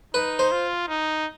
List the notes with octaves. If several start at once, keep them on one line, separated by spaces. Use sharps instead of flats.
D#4 B4
C5
F4
D#4